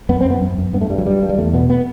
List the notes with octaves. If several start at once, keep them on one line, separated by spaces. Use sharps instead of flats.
F#2 B3
C4
F#2 B3
F#2
F#2
G2 B3
A3
G2 G3
F#3
G2 G3
G2
G3
E2 A3
B2 B3
B3